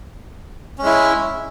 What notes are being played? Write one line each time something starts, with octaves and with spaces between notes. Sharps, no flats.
G#3 C#4 E4